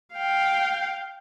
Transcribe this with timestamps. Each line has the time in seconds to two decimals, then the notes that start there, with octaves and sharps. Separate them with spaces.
0.14 F5 G5